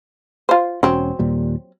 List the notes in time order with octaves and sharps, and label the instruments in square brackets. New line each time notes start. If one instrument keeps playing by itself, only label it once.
[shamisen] F4 C5
[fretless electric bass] E1 C#4 [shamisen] F#3 C4
[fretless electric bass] D#2 A#2 G3